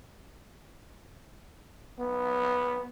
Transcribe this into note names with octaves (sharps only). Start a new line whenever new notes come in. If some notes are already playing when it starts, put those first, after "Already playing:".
B3